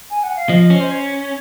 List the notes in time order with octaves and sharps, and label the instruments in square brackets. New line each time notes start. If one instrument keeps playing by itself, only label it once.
[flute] G#5
F#5
F5
[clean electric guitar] F3 [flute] D#5
[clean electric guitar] C#4
[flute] C5
C#5